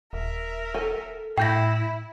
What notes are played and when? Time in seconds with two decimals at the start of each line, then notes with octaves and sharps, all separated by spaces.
0.13 D#1 A#4 E5
0.74 A4 G#5
1.38 A2 E4 G5 G6 A#6